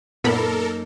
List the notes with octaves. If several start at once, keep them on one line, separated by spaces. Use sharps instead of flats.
F#2 A#2 A#3 B3 D#4 A4 A#4 B5